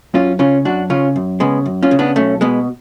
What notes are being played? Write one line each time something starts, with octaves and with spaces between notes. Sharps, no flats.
F#2 C#4 F4
C#3 C#4 F4
F#2 D4 F#4
C#3 C#4 F4
F#2
C#3 G#3 B3
F#2
C#4 F4
C#3
B3 D4
B1 A3 C#4
B2 G#3 B3